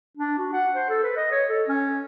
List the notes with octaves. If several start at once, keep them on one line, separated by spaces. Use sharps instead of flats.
D4
F#4
F#5
C5
A4
B4
D#5
C#5
A4
C#4